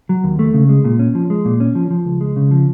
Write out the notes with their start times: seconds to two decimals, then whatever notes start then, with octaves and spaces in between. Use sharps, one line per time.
0.09 F#3
0.24 D#2
0.39 A3
0.54 C#3
0.69 G#3
0.85 A#2
0.99 C#4
1.15 F3
1.30 G#3
1.45 A#2
1.60 C#4
1.75 F3
1.90 F3
2.05 C#2
2.21 G#3
2.36 C#3
2.51 F3